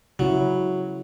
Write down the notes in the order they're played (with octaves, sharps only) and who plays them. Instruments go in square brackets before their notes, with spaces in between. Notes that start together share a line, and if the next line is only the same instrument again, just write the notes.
[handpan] C#3 E4 [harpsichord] F#3